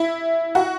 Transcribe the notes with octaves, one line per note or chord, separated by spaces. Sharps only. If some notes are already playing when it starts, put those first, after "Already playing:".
Already playing: E4
F#4